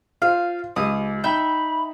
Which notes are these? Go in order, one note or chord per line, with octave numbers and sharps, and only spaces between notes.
F4 C5 F5
C#2 G4 D#6
D#4 E5 G5 B5 G6